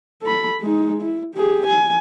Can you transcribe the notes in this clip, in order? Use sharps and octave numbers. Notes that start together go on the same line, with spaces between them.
A4 B5
G#3 D#4
E4
G4 G#4
G#5